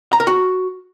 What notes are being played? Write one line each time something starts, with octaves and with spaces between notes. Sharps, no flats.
A#5
A#4
F#4